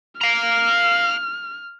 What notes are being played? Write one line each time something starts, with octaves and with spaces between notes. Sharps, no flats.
F5 A#5 F6